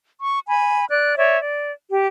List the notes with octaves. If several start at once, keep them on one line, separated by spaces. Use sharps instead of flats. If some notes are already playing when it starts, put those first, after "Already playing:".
C#6
G#5 B5
D5 F#6
C#5 D5 E5
D5
G4